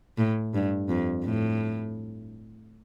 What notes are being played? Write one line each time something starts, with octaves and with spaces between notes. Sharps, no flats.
A2
G2
F2
A2